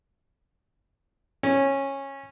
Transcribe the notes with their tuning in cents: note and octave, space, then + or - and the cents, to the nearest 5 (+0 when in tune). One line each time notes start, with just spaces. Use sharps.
C#4 -15